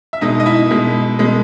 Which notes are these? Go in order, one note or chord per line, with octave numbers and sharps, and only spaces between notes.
E5
B2 G#3 D#4 D#5
D#5
E4 E5
B2 G#3
B2 G#3